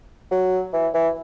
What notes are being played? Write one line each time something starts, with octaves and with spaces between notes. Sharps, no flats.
F#3
E3
E3